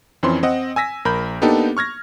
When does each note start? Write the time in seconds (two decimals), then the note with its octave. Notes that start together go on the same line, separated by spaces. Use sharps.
0.23 F2 E3 C4 C#4 C6
0.43 C4 D#5 F#5
0.76 G#5 E6 A#6 B6
1.05 A#1 A#4 B5 G6
1.42 A#3 B3 D4 D#4 G4 A4
1.77 C#6 F6 G#6 A#6